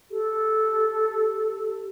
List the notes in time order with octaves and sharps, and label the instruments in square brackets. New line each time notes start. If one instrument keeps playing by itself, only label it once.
[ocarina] G4 [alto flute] A4